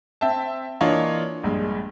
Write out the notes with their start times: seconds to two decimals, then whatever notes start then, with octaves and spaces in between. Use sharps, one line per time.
0.21 C4 E5 G5 A5
0.81 E3 A#3 D4 F4 C#5 D#5
1.44 A#1 G2 G#3